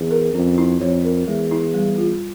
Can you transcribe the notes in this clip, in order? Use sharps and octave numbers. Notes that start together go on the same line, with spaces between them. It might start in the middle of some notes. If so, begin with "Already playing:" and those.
Already playing: E2
A#4
F2 C#4
E4
F2 C#5
A#4
E2 G#3
E4
G3
F4